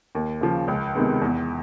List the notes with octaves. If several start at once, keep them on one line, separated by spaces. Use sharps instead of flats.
D#2
C#3 F3
C#2
C3 D#3 G#3 B3
E2